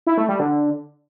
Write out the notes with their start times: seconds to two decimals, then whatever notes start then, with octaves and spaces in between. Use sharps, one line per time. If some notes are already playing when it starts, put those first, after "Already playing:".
0.07 E4
0.18 A3
0.29 G3
0.40 D3